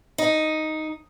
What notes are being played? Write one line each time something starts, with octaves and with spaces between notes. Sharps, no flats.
D#4